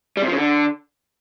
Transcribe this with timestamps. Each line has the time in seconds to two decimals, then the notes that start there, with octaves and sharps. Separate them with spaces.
0.17 G3
0.22 C3
0.27 F3
0.33 C#3
0.38 D3